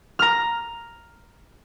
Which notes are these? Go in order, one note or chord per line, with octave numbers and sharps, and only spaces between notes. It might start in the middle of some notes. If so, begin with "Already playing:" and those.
A#5 F6